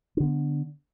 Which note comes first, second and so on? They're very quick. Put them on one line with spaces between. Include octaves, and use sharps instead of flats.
D4 D3 B3